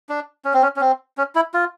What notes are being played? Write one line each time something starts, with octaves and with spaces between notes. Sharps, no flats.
D4
C#4
C4
C#4
C#4
C4
C#4
E4
F4